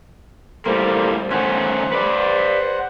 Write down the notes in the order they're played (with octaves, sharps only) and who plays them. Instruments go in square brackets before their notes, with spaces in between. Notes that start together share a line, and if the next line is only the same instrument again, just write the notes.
[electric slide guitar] A2 G3 A#3 [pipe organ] A3 A#4 C5
[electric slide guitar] D#3 A3 C#4 [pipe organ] C5 F#5
[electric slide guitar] B4 D5